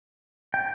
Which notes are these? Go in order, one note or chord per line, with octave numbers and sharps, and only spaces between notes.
G5